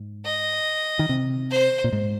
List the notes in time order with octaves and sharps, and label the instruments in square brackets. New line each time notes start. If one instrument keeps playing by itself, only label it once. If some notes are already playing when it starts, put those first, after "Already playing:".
Already playing: [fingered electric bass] G#2
[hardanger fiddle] D#5
[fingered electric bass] D#3
C3
[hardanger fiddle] C5
[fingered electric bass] A#2
G#2